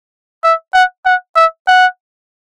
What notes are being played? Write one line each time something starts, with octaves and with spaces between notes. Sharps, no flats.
E5
F#5
F#5
E5
F#5